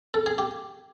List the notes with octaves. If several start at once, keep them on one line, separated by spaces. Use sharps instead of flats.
A4
G#4
G4